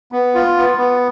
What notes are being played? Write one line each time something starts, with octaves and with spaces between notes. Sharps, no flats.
B3
F4
B3
B3